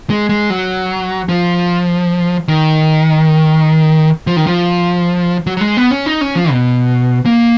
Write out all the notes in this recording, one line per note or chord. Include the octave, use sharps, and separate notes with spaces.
G#3
G#3
F#3
F3
D#3
F3
D#3
F3
F#3
F#3
G#3
B3
C#4
D#4
C#4
F3
B2
A#3